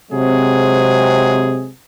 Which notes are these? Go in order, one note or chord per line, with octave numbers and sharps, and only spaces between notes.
C3 F#3 G#3 C4 G#4